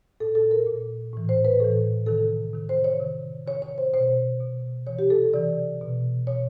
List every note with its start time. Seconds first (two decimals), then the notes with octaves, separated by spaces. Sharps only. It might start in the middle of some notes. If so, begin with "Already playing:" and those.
0.20 A#2 A4
0.35 A4
0.51 A#4
0.67 A#2
1.13 A2 E3
1.29 C5
1.45 B4
1.60 A2 E3 A4
2.06 C3 D#3 A4
2.53 C3 D#3
2.69 C5
2.84 C#5
3.00 C3 D#3
3.47 C3 D#3 C#5
3.62 C#5
3.78 C5
3.94 B2 C5
4.40 B2
4.86 C3 E3 C#5
4.99 G4
5.10 A4
5.34 C3 E3 D5
5.81 B2
6.27 B2 C#5